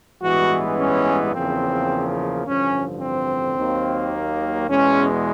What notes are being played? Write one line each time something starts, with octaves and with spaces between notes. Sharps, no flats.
A1 G2 E3 G#3 B3 F#4
C#4
E2 C#3 F3 A#3 C4
A1 G2 D3 F3 C#4
C4
D#2 D#3 F#3 A#3
E2 B2 G#3 C#4